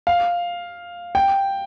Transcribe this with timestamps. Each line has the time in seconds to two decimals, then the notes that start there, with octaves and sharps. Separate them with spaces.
0.07 F5
1.15 G5